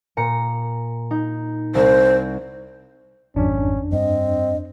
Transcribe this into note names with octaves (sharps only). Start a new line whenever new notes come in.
A#2 A#5 C#7
D#4
C2 C5
G#1 F2 F#3 C#4 D4
G2 C4 D#5